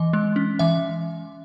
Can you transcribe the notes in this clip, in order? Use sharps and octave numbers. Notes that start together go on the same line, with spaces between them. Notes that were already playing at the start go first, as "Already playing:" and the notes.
Already playing: E3 D#5
G#3
C#4
E3 E5